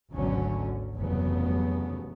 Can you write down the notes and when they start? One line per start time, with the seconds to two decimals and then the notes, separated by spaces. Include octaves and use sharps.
0.11 G#1 D2 B2 D3 F#3 C#4
0.97 F1 E2 G2 C#3 F#3 B3